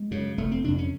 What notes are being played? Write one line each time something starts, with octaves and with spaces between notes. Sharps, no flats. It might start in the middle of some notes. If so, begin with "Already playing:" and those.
Already playing: G#3
F#2 C#3
F1 A3
C4
F2 C3 D4
C#4